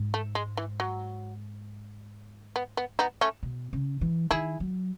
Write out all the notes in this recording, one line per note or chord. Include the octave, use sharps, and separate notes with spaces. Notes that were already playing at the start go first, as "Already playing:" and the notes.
Already playing: G#2
A3
G#3
E3
F#3
B3
B3
B3 D#4
A3 C#4
B2
C#3
E3
D#3 E4 G#4
F#3